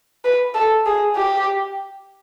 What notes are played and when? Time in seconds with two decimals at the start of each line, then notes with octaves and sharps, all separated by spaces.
0.24 B4
0.55 A4
0.86 G#4
1.17 G4